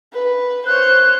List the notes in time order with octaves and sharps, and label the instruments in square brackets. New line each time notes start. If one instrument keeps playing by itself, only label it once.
[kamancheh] B4
[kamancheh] C5 C#5 [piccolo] F#6